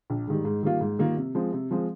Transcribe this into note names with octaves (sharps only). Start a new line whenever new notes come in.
A#1
G#2 D#3 G3
G#2
D#3 G3 A#3 F4
G#2
D#3 G3 A#3 F4
C3
F3 G#3 C4
C3
F3 G#3 C4